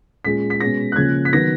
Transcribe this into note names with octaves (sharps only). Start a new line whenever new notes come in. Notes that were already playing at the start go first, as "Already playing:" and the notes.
A#2 G#3 C#4 B6
B6
B2 G#3 C#4 A#6
F#6
C#3 F3 A#3 C#4 G#6
B6
D#3 F#3 B3 A#6